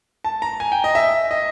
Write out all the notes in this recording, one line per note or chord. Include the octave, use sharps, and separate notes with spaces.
A5
A#5
G#5
G5
D#5
E5
D#5